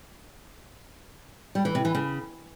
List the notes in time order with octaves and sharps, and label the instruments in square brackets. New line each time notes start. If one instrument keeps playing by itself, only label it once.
[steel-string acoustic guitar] G3
E3
C3
E3
C#3